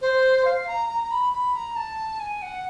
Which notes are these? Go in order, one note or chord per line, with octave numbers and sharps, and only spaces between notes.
C5
F5
A#5
A#5
A#5
B5
B5
A#5
A5
G#5
F#5